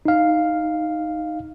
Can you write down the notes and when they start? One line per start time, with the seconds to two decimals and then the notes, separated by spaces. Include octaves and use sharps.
0.05 D#4 F5